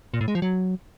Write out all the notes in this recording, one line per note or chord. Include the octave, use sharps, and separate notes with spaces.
A#2
A2
G#3
F3
F#3